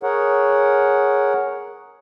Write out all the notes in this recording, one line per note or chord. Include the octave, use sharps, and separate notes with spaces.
G#4 A#4 C#5 F#5